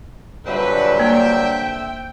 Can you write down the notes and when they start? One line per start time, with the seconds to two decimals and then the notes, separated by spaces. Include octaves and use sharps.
0.47 G2 A#2 D3 F#3 C4 B4 E5
1.00 A#3 G5